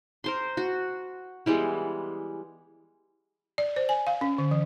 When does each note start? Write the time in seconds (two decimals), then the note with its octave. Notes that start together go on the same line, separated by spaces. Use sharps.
0.24 A#4 C5 C6
0.57 F#4
1.46 E3 G3 G#3 B3
3.58 D5
3.76 C5
3.89 G#5
4.07 F5
4.21 C#4
4.38 D3
4.51 E3